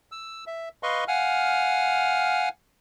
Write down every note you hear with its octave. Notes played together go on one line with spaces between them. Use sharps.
E6
E5
B4 D#5 F5 C6 C#6
F5 F#5 G#5 F6